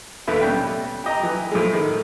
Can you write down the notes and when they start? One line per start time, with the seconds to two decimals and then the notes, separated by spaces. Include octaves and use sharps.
0.27 D#2 A2 D3 E4 B4
0.41 B2 G3 C#4 G5
1.04 G4 D#5 A#5
1.23 E3
1.52 A2 F3 G#3
1.73 D3 D#3